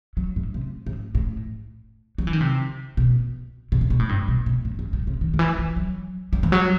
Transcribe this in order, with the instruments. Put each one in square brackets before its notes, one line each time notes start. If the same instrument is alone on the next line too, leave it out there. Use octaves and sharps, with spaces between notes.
[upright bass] F#3
A2
C3
A2
A2
F#3
E3
D#3
C3
B2
B2
C3
B2
A2
G2
B2
B2
A2
F#2
A2
C3
D#3
D#3
E3
E3
F#3
G3
E3
F#3